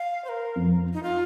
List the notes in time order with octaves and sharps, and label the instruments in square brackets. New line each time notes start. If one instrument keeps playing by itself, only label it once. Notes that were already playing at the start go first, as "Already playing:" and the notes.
Already playing: [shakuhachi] F5
C5
A#4
[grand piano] F2
[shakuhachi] D#4
F4